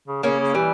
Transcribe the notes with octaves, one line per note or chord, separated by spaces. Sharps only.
C#3
C#3 A#3 C#4
C#3
E3 G3